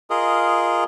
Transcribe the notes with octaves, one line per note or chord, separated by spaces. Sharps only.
F4 G#4 A#4 D#5